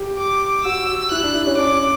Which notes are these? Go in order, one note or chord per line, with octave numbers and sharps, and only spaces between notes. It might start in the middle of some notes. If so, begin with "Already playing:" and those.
Already playing: G4
D6
F#4 E6
E4 F#6
D4
E4
C#4
D4 D6
D4